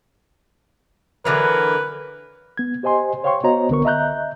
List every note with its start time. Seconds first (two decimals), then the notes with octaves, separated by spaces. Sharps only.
1.25 D3 E3 F#3 A#4 B4
2.57 B3 G#6
2.83 G4 C5 D#5 G#5 C6
3.23 C5 C#5 F5 G5 C6 C#6
3.43 B3 F#4 C5 C#5 D#5 A#5
3.69 C2 D3 B3 A#4 C#6
3.85 D#5 E5 A#5 F#6 G6